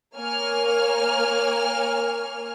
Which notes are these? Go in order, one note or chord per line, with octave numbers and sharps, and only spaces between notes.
A#3 C#5 G#5 F6